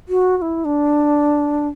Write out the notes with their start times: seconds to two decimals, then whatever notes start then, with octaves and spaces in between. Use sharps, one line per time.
0.09 F#4
0.37 F#4
0.42 E4
0.65 D4